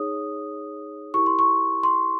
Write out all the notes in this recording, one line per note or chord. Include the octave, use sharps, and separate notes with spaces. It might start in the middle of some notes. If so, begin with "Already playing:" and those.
Already playing: D#4 G#4 C#5 D#6
E4 G4 A#4 C#6
C6
C#6
C6